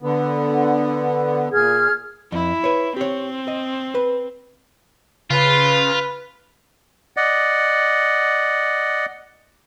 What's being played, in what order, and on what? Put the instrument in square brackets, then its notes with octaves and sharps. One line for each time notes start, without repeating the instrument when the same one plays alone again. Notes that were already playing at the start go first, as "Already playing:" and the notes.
[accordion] D3 B3
[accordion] A#2 [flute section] G#4 F6 G#6
[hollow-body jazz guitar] F2 [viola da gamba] E4
[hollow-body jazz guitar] B4 C#5
[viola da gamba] C4 [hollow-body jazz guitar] G4 C#5
[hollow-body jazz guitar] D#5
B4
[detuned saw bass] C#3 [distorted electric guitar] F4 [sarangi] B4
[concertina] D5 D#5 F#5